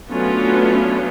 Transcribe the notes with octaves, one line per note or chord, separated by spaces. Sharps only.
F#3 A3 B3 C#4 D4 F4